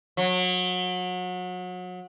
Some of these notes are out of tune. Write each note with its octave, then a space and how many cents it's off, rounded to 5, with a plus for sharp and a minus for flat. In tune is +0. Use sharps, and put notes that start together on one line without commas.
F#3 -30